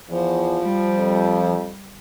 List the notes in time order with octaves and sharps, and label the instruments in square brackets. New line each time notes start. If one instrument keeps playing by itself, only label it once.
[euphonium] E2 [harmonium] F3
[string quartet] G3
[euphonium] F2